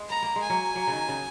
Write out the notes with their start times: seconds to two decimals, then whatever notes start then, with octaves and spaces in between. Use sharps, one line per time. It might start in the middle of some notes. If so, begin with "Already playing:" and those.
Already playing: G#3
0.09 B3 A#5
0.22 A#3
0.36 G#3
0.42 G#5
0.50 F#3 A#3
0.75 F#3 A#3
0.87 C#3
0.92 D#3
1.08 C#3